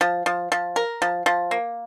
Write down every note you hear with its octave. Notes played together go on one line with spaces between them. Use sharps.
F3
F3
F3
A#4
F3
F3
A#3